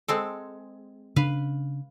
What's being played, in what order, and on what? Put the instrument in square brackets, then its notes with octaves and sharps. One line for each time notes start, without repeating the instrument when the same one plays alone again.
[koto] G#3 C4 A4
[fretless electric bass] C#3 D4 [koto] B4 F5